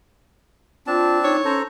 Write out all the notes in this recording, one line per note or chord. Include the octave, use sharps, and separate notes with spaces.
C4 D4 F4 A5
D#4 C#5
C#4 A4 C5 A#5